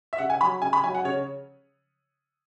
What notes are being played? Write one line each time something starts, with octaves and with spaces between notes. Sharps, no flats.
E5
C#3 F#5
G#5
F#3 B5
C#3 G#5
B5
F#3 G#5
F#5
C#3 C#5